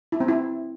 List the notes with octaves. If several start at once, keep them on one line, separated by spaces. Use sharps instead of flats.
E4
C4
E4